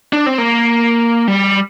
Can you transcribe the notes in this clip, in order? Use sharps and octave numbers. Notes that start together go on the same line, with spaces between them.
D4
C4
A#3
G3